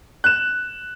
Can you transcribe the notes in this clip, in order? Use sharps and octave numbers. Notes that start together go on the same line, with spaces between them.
F#6 E7